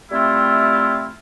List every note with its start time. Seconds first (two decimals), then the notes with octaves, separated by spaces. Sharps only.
0.12 G3 A3 C4 E4 F4